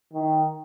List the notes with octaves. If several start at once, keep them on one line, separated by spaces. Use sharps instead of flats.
D#3